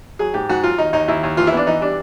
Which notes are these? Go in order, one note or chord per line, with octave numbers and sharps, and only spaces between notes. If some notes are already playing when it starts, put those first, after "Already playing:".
F#3 G#4
G#2 G4
G#2 F#4
F#3 F4
D#2 D#4
D#2 D#4
D#2 E4
D#2
E3 F4
E4
B3 D4
E3 D#4
G3 D4